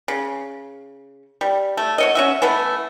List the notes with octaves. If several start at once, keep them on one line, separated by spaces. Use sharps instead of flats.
C#3
G3
A3
F#4 C#5 D#5
C#4 F#4 E5
E3 A3 B3